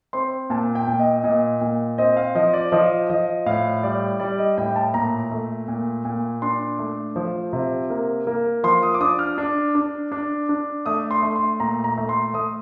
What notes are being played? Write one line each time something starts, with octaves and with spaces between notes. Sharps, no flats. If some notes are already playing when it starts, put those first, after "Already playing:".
C4 C6
A#2 A5
G5
A#2
D#5
A#2 D#5
A#2
C4 D#5
F5
F3 D#5
D5
F3 D#5
F3 D#5
A2 F5
G3 D5
G3 D5
D#5
A2 G5
A5
A#2 A#5
A3
A#2
A#2
D4 C6
A3
F3
C3
A#3
A#3
F3 C6
D#6
D6
D4 D#6
F6
D4
D4
D4
D4
A3 D#6
C6
A3
C6
A#2 A#5
A#5
A3
C6
A3 D#6